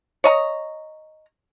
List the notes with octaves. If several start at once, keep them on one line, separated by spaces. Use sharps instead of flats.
C#5 D#5 A#5